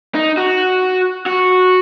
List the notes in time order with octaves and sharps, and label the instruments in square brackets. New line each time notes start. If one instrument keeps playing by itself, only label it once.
[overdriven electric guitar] D#4
F#4
F#4